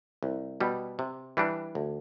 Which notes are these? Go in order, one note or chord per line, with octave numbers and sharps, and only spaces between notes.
C2
B2 G3
C3
E3 G3 D4
D2